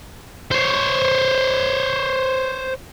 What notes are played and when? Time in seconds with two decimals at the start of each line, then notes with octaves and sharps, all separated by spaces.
0.51 C5 C#5